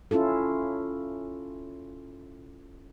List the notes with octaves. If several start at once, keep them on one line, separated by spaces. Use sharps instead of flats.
C#4 E4 F4 A4